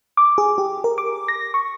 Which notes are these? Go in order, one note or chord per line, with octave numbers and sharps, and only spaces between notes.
D6
G#4
G4
A#4
D6
A#6
C#6